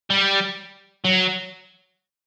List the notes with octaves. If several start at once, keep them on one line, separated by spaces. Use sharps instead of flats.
G3
F#3